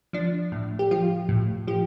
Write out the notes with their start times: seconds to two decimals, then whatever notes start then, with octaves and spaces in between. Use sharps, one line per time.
0.13 F3 D4
0.52 A2
0.79 G4
0.91 F3 F4
1.29 A2
1.67 F3 G4